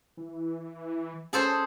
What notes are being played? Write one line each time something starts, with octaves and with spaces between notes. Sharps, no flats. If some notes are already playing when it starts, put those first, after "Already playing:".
E3
C#4 G#4 A4 C5